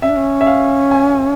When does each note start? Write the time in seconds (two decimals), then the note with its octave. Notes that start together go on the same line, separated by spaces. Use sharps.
0.02 C#4 E5
0.09 D4
0.16 C#4
0.41 E5
0.47 F5
0.91 G#5